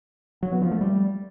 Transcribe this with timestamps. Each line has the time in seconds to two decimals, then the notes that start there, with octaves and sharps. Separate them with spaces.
0.43 F#3
0.52 B3
0.62 F3
0.71 A3
0.81 G3